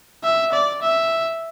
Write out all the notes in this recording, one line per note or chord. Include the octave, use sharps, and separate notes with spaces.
E5
D5
E5